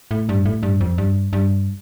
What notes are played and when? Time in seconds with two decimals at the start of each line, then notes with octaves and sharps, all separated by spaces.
0.11 A2
0.29 G2
0.45 A2
0.63 G2
0.81 F2
0.98 G2
1.33 G2